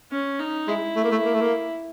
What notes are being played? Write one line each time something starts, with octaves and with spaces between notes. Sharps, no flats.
C#4
D#4
G#3 E4
A3
A#3
A3
A#3
A3
A#3